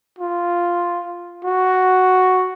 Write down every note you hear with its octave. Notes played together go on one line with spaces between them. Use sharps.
F4
F#4